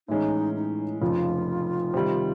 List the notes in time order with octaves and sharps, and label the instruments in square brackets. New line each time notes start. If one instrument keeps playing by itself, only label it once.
[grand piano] A2 E3 G#3 C#4 [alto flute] D#4
[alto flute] D#4
E4
[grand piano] F1 F2 C#3 F3 [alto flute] F4
[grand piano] C3 D#3 G3